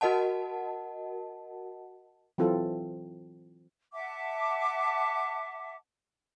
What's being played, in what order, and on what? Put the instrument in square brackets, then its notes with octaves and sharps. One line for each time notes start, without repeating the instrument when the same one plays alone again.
[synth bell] F#4 A#4 D#5 F#5 A5
[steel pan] E3 F#3 C4 F4 A4
[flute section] E5 F#5 A5 D6